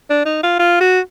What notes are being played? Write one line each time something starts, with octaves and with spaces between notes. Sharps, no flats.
D4
D#4
F4
F4
F#4